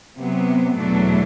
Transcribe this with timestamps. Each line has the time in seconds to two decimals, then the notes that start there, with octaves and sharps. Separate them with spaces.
0.19 C3 F#3 B3
0.77 E2 B2 F#3 A3 D4